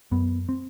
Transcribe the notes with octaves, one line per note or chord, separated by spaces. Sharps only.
F#2 B3
C4